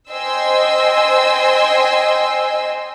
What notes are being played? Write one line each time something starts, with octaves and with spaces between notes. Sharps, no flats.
C5 D#5 G5 G#5 C6 E6